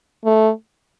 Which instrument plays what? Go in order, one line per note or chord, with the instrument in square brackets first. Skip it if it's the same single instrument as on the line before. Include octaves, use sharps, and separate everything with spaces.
[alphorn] A3